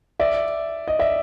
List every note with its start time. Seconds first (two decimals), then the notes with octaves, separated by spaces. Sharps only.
0.20 D5 E5
0.88 D#5
0.99 D5 E5